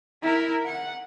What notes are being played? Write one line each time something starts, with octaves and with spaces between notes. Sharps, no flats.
E4 A#4
F#5